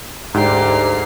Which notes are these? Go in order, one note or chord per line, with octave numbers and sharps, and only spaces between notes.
D2 G#2 E3 D4 G4 A#5 C7